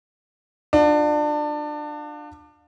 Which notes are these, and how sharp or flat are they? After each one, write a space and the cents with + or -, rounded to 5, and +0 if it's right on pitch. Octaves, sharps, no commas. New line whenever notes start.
D4 +25 F4 +25